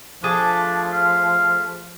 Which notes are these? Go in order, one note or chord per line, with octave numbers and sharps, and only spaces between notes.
F3 A3 D4 G#4 A5
F5